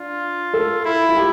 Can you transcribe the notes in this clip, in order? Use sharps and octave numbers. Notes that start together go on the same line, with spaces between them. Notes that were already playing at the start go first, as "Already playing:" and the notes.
Already playing: D4 F4
A4
E4
F4
G4